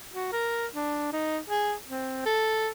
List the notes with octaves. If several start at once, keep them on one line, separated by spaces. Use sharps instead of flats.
F#4
A#4
D4
D#4
G#4
C4
A4